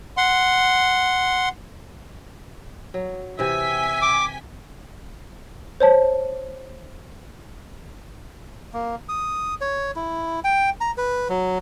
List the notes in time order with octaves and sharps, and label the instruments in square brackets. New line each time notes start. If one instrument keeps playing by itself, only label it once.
[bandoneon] F#5 C6
[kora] F#3
[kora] C3 E3 [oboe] E5 [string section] G5 G#5 B6
[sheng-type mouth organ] D6
[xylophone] C5 C#5 A5
[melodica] A#3
D#6
C#5
E4
G5
A#5
B4
F#3